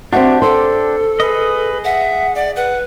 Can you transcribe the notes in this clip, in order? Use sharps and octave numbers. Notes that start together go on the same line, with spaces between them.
C4 D4 F#4 G4 E5
A4 C5
G#4 B4 D#5
E5 F#5
D5
B4 F#5